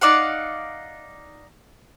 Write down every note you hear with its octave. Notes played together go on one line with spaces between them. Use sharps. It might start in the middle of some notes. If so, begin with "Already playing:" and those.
D#4 D5 F5 F#5